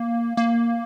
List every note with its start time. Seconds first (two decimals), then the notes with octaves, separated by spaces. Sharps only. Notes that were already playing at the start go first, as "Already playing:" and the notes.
Already playing: A#3
0.37 A#3